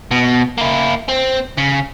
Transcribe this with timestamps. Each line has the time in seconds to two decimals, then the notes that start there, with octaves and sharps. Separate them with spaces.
0.11 B2
0.58 A#3 E4
1.09 C4
1.58 C#3